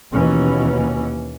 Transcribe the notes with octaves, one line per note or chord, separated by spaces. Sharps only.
D#2 B2 E3 C#4